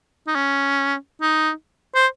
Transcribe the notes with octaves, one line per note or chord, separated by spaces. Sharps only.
D#4
C#4
D#4
C5